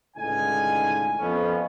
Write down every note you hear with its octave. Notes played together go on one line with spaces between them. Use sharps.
C#2 A2 D3 D#3 D#4 G#5
F2 F3 B3 C#4